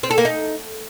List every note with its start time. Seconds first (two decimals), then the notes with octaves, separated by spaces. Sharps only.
0.03 C4
0.11 A4
0.18 A#3
0.25 D#4